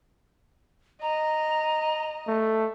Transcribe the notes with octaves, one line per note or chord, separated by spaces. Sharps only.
D#5 A#5
A3